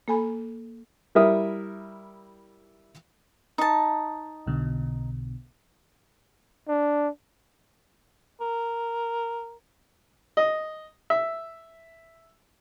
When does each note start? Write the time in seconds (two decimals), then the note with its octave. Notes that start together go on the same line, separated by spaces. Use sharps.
0.08 A#3 A4 G#5 B5
1.15 G3 E4 A#4 E5 D#6
3.58 D#4 A5
4.46 B1 B2 D3
6.68 D4
8.41 A#4
10.37 D#5
11.10 E5